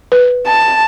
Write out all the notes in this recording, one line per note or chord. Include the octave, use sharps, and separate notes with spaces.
B4
A5